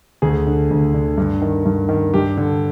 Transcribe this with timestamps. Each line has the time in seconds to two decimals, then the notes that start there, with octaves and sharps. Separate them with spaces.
0.22 D2 G#4
0.47 D3
0.71 D2
0.94 D3
1.18 G2
1.42 D#3
1.65 G2
1.89 D#3
2.14 G2 G4
2.37 D3